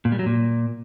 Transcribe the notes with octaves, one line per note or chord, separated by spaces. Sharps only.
A#2
G3
F#3
A#2